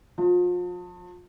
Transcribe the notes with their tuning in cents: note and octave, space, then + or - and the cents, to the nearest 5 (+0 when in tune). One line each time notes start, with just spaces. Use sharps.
F3 +35